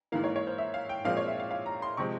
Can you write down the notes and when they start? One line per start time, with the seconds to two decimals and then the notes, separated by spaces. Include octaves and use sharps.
0.12 G#2 E3 A#3 F5
0.24 C#5
0.36 C#5
0.47 C5
0.58 E5
0.74 F5
0.89 G5
1.05 A#2 F3 G#3 C4 F5
1.17 C#5
1.27 E5
1.40 F5
1.51 F5
1.66 A#5
1.82 C6
1.97 C3 F3 G#3 C4 C#6